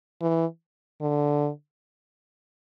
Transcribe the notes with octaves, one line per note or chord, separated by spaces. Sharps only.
E3
D3